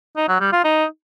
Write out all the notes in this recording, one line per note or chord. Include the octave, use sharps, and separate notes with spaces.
D#4
F#3
G3
F4
D#4